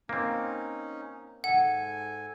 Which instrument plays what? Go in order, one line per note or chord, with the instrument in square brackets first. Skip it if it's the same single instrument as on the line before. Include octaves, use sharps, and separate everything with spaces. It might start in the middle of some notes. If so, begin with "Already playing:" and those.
[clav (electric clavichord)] A#3 C4 [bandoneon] C#4 D#4
[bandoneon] G#2 A4 G#5 [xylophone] F#5